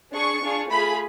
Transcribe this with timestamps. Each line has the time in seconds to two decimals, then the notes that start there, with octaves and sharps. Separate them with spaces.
0.14 D4 G#4 C#6
0.43 D4 F4 G#4
0.70 A3 F4 G#4 B5